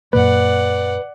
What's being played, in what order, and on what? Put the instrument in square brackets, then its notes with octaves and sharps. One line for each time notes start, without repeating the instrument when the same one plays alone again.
[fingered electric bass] F#2 A#2 A#3 [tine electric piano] B4 [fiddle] D5 F#5